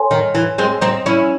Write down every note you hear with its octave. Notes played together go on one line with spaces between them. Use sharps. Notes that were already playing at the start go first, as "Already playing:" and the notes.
Already playing: A4 C#5 G#5 C6
D#3
E3
G#3 C4
C4 D#4
C#4 E4